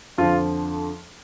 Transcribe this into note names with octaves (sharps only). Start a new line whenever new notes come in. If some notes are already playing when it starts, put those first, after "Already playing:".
F2 D3 F3 F4